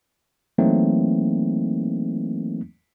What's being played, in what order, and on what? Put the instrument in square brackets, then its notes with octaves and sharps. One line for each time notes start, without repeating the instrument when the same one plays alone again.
[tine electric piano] E3 F#3 A3 A#3 C4 D#4